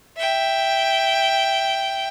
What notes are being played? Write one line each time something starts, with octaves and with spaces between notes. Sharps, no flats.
E5 G5